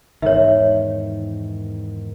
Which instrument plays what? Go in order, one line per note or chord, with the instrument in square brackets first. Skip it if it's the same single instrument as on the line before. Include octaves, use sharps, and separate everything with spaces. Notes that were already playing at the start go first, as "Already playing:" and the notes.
[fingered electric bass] E2 G#2 D#3 [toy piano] C#5 E5